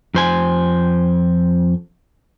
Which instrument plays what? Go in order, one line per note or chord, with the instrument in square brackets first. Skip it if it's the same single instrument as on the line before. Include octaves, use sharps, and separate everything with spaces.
[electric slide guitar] F2 C5 G#5